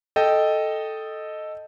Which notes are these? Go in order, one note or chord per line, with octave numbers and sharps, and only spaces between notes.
A4 D#5 G5